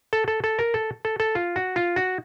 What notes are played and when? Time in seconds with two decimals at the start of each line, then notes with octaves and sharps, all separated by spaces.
0.13 A4
0.28 A4
0.44 A4
0.59 A#4
0.74 A4
1.05 A4
1.20 A4
1.35 F4
1.56 F#4
1.76 F4
1.96 F#4